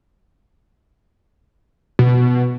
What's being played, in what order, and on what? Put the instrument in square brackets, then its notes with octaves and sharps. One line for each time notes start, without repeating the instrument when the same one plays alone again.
[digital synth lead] B2